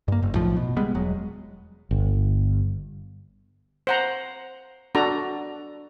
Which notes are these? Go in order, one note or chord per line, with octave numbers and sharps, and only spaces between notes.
G2 A#3
F#1
B1 F#2 A2 F3
B2
G3 G#3 B3
E1 F#3 G#3
G1
C5 F#5 A#5
D4 F#4 A4 A#5